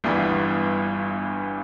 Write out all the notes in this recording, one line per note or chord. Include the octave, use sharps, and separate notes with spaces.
G1 G2 E3 G3 B3